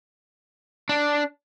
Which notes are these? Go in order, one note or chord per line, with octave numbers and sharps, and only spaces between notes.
D4